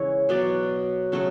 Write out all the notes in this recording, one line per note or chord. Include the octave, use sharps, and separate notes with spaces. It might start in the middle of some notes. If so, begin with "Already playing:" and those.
Already playing: C#3 E3 G#3 E4 C#5
B2 F#3 B3 D5
C#3 F#3 A3